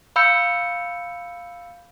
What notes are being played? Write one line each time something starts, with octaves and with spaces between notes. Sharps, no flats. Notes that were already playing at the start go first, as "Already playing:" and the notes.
F5 B5 E6 G6 C#7